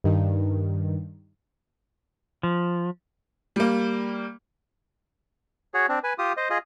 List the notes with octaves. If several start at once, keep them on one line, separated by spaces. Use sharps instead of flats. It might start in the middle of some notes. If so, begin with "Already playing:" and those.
G2 D#3
F3
G3 A#3
F#4 G#4 C#5
C4 D4
B4 G#5
F4 G4 D#6
C5 D#5
F4 G#4 D#5